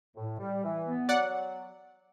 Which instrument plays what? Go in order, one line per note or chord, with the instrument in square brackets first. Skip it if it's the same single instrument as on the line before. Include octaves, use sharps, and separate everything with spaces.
[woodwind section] A2
G3
E3
B3
[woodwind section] F#3 [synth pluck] D5 F#5